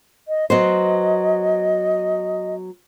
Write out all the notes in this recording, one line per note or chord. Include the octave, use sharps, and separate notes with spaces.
D#5
F#3 B3 C5 D#5